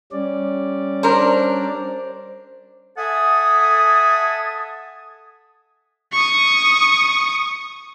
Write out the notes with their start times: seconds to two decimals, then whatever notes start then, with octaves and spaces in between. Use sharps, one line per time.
0.12 G3 C#4 D5
1.03 D4 A#4 C5
2.98 A4 E5 F#5 G#5 A5 D#6
6.12 C#6 D#6